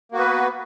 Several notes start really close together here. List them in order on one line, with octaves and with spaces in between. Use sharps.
A#3 F#4 B3 B4